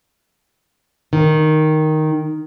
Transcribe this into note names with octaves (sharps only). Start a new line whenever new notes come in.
D#3